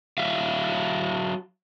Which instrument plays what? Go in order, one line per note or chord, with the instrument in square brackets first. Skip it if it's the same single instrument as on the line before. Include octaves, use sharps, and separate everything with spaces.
[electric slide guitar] F#3 E5 F5